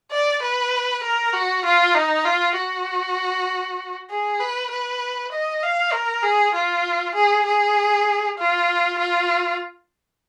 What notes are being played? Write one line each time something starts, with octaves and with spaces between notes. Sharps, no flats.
D5
B4
A#4
F#4
F4
D#4
F4
F#4
G#4
B4
B4
D#5
F5
A#4
G#4
F4
G#4
G#4
F4
F4